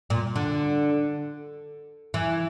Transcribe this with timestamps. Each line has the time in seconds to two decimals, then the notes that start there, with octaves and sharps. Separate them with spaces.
0.10 A#2
0.36 D3
2.14 E3